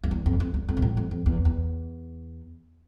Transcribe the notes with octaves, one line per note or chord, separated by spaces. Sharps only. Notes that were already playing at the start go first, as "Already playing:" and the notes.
F2
E2
F2
F2
E2
F2
B2
A2
F2
F2
E2
E2